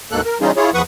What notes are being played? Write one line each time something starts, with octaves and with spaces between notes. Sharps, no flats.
D2 G#2 B2 A#3 A4 F#6
A#4
E3 G3 C#4 D#4 F4 G#4
E4 F4 G#4 C#5
E2 F3 B4 F#5 C#6 D#6